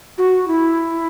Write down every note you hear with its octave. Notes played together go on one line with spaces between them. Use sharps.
F#4
E4